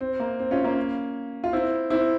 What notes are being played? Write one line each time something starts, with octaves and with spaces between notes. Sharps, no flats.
C4
A#3
C4
C#4 F4
A#3 C#4
F4
C4 E4
C4 E4